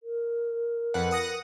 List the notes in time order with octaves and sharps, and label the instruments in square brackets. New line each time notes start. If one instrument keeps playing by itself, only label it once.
[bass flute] A#4
[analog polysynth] F2 B4 F#5
F#5 D#6 A#6